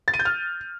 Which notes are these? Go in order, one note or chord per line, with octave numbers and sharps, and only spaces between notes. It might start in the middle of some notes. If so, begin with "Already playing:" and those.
A6
D#7
G6
F6